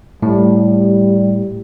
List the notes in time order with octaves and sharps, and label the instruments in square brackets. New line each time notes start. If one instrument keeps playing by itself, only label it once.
[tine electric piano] A2 [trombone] G3